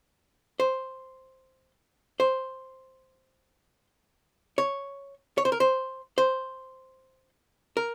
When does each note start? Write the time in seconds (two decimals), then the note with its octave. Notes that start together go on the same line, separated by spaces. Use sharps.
0.60 C5
2.20 C5
4.58 C#5
5.38 C#5
5.45 C5
5.52 A#4
5.60 C5
6.18 C5
7.77 A#4